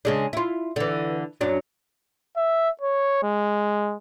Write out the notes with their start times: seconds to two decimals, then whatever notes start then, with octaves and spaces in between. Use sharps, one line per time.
0.05 C#3 G#3 D4
0.33 E4 F4
0.76 D3 E3
1.41 F#2 F#3 D4
2.37 E5
2.81 C#5
3.23 G#3